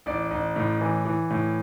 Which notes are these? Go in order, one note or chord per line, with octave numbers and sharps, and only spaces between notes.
A1 D5
A1
A2
E3
E3
A2